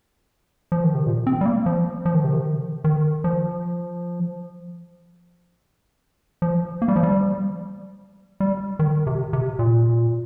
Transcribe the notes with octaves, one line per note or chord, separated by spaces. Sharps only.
F3
D#3
C3
A#2
C4
G3
A#3
F3
F3
D#3
C3
D#3
D#3
F3
F3
A#3
G3
F3
G3
G3
D#3
C3
C3
A#2